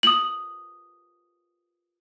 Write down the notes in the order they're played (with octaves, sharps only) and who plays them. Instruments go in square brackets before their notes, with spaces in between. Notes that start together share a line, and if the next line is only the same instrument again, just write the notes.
[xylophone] D#6 F#7